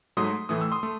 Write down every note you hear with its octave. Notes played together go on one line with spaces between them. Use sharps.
G#2 F#3 A3 C6 D#6
A2 E3 A3 D#6
E6
C6 D#6
A3